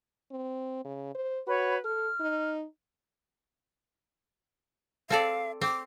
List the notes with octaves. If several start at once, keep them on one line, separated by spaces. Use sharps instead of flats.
C4
C#3
C5
F#4 B4 C#5 B5
A4 F6
D#4
C4 A4 D5 F5
C4 D6